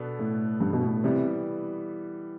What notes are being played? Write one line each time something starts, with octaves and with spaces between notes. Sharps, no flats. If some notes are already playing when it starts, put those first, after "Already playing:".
Already playing: B2 B3 D4 A4
A2
G2
B2
A2
C3 E3 G3 B3